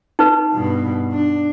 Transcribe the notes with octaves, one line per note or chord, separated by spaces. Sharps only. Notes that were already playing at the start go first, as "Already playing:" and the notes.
D#4 B4
G2 B2
D4